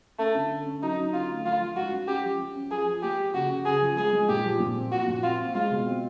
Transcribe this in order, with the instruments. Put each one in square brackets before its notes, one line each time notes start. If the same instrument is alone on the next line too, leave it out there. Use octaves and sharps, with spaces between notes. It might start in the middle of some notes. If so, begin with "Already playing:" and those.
[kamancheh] A3 [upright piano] C#4
[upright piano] D3
C#4
C#4
[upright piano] F#3 [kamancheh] D#4
[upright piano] C#4
[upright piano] D3 [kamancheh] F4
[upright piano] A3
[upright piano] F3 [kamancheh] F4
[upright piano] F3
[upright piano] G#2 [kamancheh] F#4
[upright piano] C#4
[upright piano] C#4 [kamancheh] G4
[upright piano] F3
C#4
C#4
[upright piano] F3 [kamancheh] G#4
[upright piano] F3
[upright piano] A#3 [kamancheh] G4
[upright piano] F3
[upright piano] C#3 [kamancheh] F#4
[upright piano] C#3
[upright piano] C#3 [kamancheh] G#4
[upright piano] F3
[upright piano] G#3 [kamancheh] G#4
[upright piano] G#3
[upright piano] A#2 [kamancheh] G4
[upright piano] F3
A#2
C4
[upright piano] F3 [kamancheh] F#4
[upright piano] A#2
[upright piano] C4 [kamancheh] F4
[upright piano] C4
[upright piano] G#3 [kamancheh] F4
[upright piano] B2
C4